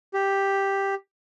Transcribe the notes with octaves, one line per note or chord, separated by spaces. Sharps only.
G4